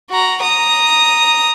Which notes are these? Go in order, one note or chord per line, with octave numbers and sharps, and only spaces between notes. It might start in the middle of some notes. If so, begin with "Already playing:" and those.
F#4 A#5
A#5 D#6